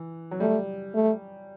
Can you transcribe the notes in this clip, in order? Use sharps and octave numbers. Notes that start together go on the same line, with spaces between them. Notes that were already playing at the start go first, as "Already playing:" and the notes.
Already playing: E3
F#3
G3 A3
A3